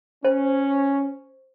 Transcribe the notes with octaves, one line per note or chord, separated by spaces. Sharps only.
C#4 C5